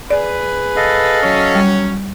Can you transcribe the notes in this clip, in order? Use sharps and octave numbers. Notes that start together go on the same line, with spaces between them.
G#4 B4 D5
A4 D#5 F5
F#3 C#4
G3